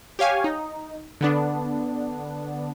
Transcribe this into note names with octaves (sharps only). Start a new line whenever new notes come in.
G4 C#5 F5 G#5
D#4
D3 B3 D4